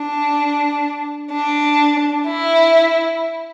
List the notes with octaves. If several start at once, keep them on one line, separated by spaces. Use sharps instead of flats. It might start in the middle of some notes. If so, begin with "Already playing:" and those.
Already playing: D4
D4
E4